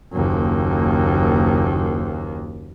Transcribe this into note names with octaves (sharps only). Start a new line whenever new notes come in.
F#1 D#2